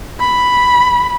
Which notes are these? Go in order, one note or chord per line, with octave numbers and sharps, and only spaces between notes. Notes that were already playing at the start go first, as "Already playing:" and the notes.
B5